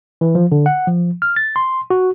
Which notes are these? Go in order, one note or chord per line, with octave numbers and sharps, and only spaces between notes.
E3
F3
D3
F#5
F3
F6
A6
C6
F#4